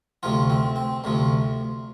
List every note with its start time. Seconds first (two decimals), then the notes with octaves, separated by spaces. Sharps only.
0.23 D2 C3 F3 F4
0.50 C4
0.76 C4
1.04 D2 C3 F3